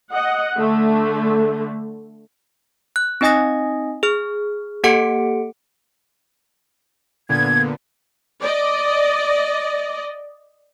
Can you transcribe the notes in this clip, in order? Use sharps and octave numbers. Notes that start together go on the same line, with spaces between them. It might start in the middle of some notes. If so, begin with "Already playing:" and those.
D#5 F#5
D3 A3
F#6
C4 D#4 D#5 G#5 D#6 A#6
G#4 F6
A#3 G4 A4 F#5 C#7 D7
A#2 D3 B3 G#6
D5 D#5